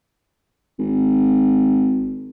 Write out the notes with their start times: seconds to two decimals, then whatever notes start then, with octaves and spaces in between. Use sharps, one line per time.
0.79 G#1